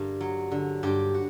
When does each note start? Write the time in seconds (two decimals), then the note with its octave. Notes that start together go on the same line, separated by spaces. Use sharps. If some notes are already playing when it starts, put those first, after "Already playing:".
Already playing: G2 D3 A#4
0.21 F#3
0.52 D3
0.83 G2 G4
1.14 F#4